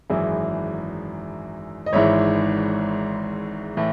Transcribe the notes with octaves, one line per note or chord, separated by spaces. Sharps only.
G#1 F#2 E3 E4 G#4
D#5
G#1 G#2 E3 C#5 E5
A2 E3